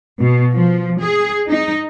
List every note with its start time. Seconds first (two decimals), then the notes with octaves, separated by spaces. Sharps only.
0.20 B2
0.54 F3
1.01 G#4
1.48 D#4